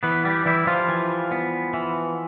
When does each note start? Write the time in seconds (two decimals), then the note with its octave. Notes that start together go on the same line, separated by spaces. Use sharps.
0.03 E3 B3 B4
0.25 G3 G4
0.46 E3 G3 E4
0.67 F3 F4
0.88 E3
1.31 B3
1.74 E3